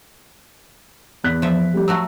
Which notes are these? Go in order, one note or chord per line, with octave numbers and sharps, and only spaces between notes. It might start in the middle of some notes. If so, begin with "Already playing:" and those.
E2 F#6 B6
F3 E5
G3 A3 G4
F#3 A3 F#4 E6